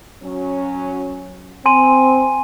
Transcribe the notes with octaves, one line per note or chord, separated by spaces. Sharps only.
F#3 C#4
C4 G#5 C6 D#7